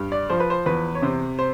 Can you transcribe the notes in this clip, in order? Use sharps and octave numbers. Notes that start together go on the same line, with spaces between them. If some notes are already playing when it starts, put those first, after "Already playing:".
Already playing: G2
D5
F3 C5
B4
C5
E2 B4
C#5
C3 C5
C5